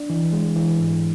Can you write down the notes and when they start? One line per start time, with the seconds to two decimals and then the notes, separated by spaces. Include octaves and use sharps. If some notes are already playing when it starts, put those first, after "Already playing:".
Already playing: D4
0.10 E3
0.33 G#3
0.56 E3
0.79 G#2